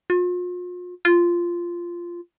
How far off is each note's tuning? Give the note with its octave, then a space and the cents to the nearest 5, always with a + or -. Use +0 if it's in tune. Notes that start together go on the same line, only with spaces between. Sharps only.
F4 +40
F4 -10